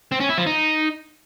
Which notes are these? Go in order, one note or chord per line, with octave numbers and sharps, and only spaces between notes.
C4
C#4
E4
F3
D#4